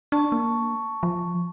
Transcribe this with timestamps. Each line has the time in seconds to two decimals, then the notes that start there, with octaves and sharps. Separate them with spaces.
0.12 D4 A5 C#6
0.32 A#3
1.03 F3